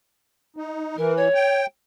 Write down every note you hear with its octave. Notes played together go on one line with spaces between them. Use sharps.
D#4
E3 A#4
C#5
G5